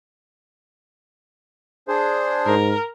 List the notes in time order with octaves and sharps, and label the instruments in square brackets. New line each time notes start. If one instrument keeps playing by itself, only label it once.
[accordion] D4 G#4 C5
[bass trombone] G#2 [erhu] A#4